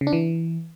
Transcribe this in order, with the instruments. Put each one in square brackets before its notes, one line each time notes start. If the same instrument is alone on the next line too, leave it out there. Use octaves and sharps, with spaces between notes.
[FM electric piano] C#3
D4
E3